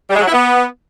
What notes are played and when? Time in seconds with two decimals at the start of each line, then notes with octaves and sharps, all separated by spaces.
0.10 G3
0.16 G#3
0.21 F#3
0.27 E4
0.32 B3